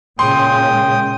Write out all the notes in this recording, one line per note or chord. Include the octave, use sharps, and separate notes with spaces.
A#2 C#3 G#3 G5 C6 D#6